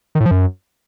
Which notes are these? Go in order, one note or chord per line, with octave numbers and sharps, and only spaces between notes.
D#3
A2
F3
F#2